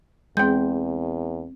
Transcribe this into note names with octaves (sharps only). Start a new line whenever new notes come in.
E2 G#3 C4 G5 G6